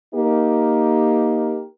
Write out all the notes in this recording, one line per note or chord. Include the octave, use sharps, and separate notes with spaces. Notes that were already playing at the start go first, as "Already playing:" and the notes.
A#3 D#4 G4 A#4